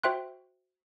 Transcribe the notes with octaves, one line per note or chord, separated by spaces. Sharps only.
F#4 C5 E5 G5 C6 F#6